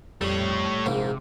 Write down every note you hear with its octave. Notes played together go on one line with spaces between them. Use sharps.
F2 G3 A3 C#5
A#1 G#2 C3 A#3